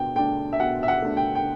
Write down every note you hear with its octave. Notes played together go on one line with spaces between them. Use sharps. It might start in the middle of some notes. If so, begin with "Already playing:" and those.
Already playing: B2 D4 G5
A3 D4 G5
E5
B2 F#5
E5
F#5
A3 D4
G5
G5